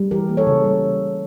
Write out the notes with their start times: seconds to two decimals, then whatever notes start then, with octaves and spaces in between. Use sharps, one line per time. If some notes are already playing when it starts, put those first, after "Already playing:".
Already playing: G3
0.11 E3 G4 A#4
0.29 A#3
0.37 A4 C#5
0.47 C#3
0.64 G3